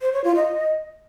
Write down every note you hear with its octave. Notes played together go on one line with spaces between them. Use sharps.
C5
C#5
F4
D#5